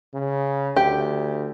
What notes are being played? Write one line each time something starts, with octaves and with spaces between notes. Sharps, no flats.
C#3
D2 G4